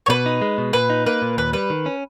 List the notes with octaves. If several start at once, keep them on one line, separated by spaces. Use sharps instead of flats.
C#5
B2 B4
D#4
G#3
B2
A#2 B4
D#4
A#3 B4
A#2
D#2 B4
G3 B4
D#3
C#4